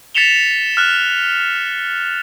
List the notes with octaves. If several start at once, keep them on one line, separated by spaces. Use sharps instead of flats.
A6 B6 C#7 E7 F7 G7
F6 F#6